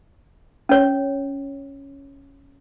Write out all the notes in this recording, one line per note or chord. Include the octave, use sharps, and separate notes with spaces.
C#4 C#5